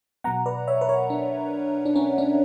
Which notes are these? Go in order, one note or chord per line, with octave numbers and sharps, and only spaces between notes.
B2 F#3 B3 F#5 A#5
B4 D5
C#5 E5
B4
A#4 C#5
D4
D4
C#4
D4